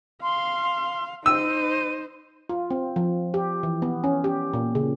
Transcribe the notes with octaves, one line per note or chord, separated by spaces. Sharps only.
F5 C6
D#4 C5 E6 D#7
F4
C4
F3
G4
E3
B3
C#4
G4
A#2
C#3